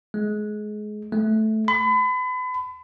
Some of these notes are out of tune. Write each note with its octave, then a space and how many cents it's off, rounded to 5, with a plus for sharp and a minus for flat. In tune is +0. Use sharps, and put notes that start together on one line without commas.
G#3 +25
A3 -10
B5 +35